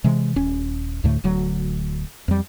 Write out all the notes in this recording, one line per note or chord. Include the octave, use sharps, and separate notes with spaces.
C3 E3 G#3
D#1 C#4
D2 A2 D3 A3
D1 D2 F#3
F2 G3